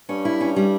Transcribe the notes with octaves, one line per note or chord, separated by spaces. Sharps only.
G2 C#4
E4
C#4
G3